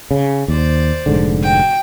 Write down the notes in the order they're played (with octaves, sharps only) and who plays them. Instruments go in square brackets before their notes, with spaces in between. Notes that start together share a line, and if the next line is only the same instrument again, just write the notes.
[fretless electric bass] C#3
[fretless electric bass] D#2 [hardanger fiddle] C5 D5
[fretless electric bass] F1 G#2 D3
[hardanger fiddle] F#4 G5